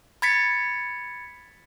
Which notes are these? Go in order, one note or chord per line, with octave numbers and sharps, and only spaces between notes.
B5 G#6 A6 B6 C#7